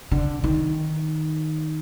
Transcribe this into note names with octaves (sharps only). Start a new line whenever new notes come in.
D3
D#3